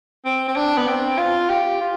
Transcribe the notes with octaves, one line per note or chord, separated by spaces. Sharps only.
C4
C4
D4
B3
C4
F4
G4
F4